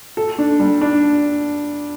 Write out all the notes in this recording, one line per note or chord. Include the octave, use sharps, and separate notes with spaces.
A4
D4
G3
D4